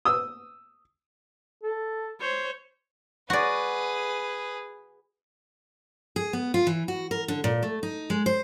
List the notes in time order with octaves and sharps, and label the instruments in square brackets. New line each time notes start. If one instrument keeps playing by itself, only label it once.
[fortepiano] D#6 E6
[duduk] A4
[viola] C5 C#5
[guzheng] F#4 D5 [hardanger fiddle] G#4 B4
[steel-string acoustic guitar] G#4
B3
F4
E3
F#4
A#4
D3
A#2
A3
D#4
G#3
C5